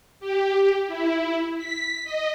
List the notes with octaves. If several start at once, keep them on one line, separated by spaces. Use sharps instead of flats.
G4
E4
B6
D#5